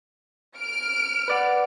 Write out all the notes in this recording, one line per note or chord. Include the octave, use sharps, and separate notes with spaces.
F6 D7
B4 D5 F#5